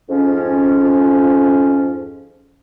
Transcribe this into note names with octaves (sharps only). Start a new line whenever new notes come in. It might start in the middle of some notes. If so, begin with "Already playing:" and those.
F2 G#2 F3 C#4